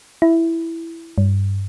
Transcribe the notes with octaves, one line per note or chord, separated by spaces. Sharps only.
E4
G2